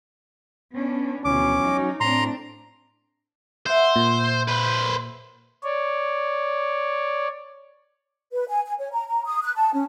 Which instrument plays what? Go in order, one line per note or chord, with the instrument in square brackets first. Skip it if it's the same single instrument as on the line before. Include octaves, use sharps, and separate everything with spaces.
[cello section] B3 C#4 D4
[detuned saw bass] D2 [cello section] B2 E3 F3 [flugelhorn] C#4 [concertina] D6
[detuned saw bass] F#3 [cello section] D#4
[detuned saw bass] A2 [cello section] C4 D4 [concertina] A#5 C6
[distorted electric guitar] C5 [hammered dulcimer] E5 F#5
[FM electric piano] A#2
[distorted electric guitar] B4 C5
[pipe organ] C#5 D5
[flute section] B4
G#5
G#5
C#5
A#5
A#5
D#6
F#6
A5
C#4